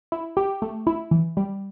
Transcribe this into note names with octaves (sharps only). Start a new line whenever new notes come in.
E4
G4
A3
E4
E3
G3